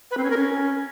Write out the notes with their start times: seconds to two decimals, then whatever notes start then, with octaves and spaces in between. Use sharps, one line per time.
0.11 B4
0.17 C4
0.24 C#4
0.30 A#4
0.37 C#4